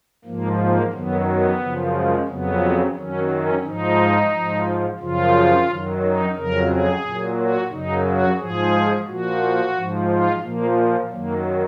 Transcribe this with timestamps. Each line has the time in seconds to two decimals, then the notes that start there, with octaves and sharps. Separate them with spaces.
0.24 G#2 F3 A#3
0.59 A#3
0.93 F#2 D#3 F#3 B3
1.26 B3
1.61 F#2 C#3 F3
1.95 G#3
2.28 F2 C#3 F#3 B3
2.95 F#2 D#3 F#3 C#4
3.30 C#4
3.64 G#2 F3 D#4
4.32 G#2 F3
5.00 F#2 C#3 F3 F4
5.68 F#2 D#3 F#3
6.02 D#4
6.35 F2 C#3 F#3 A#4
6.69 G#4
7.03 A#2 F#3
7.37 F#4
7.70 F#2 C#3 F#3 D#4
8.05 F#4
8.39 G#2 F3 G#4
9.06 A#2 F3 F#4
9.74 G#2 F3
10.08 F4
10.42 A#2 F3 A#3
11.09 F#2 D#3 F#3 A#3